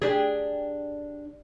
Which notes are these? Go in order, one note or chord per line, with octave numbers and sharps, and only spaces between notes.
D4 G4 G#4